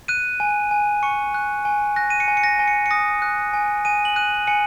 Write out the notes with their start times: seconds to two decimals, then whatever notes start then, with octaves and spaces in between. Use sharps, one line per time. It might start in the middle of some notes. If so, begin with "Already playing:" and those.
0.08 F#6 D#7
0.40 G#5
0.71 G#5
1.03 C#6 C#7
1.34 F#6
1.65 G#5
1.96 F#6 A#6
2.10 D#7
2.20 C#7
2.28 G#5
2.37 C#7
2.44 A#6
2.59 G#5
2.68 C#7
2.86 C#7
2.91 D#6 A#6
3.22 F#6
3.53 G#5
3.85 G#5 D#7
4.05 F#7
4.16 F#6 D#7
4.47 G#5 C#7